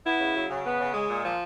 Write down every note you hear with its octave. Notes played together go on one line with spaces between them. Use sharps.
B3 E4
C#3
F#3
C#3
B3
C#3
G#3
A#2
F3